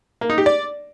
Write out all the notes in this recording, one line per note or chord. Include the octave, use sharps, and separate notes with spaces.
A#3
D#4
G4
D5